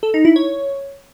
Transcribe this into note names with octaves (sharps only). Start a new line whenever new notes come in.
A4
D#4
E4
C#5